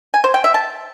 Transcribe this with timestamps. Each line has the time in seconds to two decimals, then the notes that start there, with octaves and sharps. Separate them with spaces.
0.14 G#5
0.24 C5
0.34 G5
0.44 E5
0.54 A5